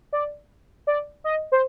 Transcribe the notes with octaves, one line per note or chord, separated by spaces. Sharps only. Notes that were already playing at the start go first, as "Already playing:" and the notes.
D5
D5
D#5
C5